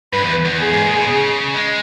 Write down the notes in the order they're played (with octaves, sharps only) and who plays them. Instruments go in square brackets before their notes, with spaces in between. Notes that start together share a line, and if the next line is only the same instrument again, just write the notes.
[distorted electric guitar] G2 [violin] B4
[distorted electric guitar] E2
E2
[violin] G#4
[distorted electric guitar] G#2
A#2
B2
C#3
G#3